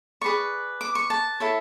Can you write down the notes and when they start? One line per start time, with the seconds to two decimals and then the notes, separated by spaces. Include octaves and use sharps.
0.21 G#4 B4 D5 C#6
0.81 D6
0.95 C#6
1.10 A5
1.40 E4 A4 C#5